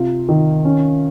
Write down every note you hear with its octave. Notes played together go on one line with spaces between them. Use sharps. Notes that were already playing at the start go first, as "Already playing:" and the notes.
Already playing: C3 F4
D#3
C#4